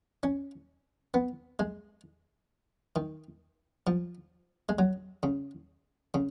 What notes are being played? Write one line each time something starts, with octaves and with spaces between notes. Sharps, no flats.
C#4
B3
G#3
D#3
F3
G#3
F#3
C#3
C#3